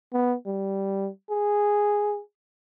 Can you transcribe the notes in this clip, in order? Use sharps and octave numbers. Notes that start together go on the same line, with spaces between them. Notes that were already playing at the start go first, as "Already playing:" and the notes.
B3
G3
G#4